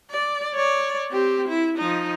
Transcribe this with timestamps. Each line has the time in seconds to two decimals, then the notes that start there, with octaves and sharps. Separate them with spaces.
0.11 D5
0.55 C#5 D5
1.11 C4 G4
1.48 E4
1.78 F3 D#4